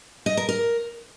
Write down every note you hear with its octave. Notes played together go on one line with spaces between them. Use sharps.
D#5
A#4
A#4